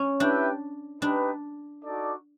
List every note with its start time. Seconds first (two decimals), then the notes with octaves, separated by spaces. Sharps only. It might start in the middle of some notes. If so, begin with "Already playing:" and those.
Already playing: C#4
0.20 D4 E4 G4 B4 E5 G5
1.02 D4 D#4 G4 B4
1.84 D#4 F#4 A4 D5